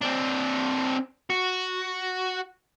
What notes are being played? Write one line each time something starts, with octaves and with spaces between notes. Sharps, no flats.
C4 D4
F#4